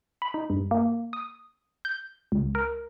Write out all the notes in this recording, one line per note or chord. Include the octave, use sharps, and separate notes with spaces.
B5
D#4
G2
A#3
D#6
G6
C#2
A#4